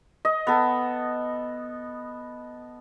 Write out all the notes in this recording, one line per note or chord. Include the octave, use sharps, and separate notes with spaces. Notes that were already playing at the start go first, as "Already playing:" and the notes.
D#5
B3 A4